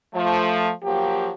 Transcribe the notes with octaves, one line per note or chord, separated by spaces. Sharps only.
F3 A3
F3 F#3 A#3 G4